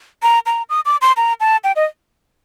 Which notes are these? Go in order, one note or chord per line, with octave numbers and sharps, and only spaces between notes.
A#5
A#5
D#6
D6
C6
A#5
A5
G5
D#5